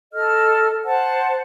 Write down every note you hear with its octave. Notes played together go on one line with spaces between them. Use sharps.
A4 D#5 F6
C5 F#5 A5